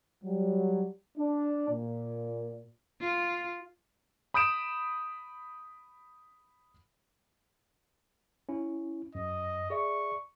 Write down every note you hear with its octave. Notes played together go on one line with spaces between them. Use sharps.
F#3 G3
D4
A#2
F4
B5 D#6 G6 D7 E7
C#4 E4
F#2 D#5
G#4 D5 E5 C#6